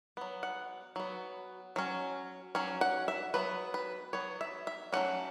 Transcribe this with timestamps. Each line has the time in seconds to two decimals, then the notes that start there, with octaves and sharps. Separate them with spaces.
0.17 F#3 B3
0.43 F#5
0.96 F#3 B3
1.76 F#3 C#4
2.55 F#3 C#4
2.81 F#5
3.08 E5
3.34 F#3 B3 B4
3.74 B4
4.13 F#3 B3 C#5
4.41 E5
4.67 E5
4.93 F#3 A3 C#4 F#5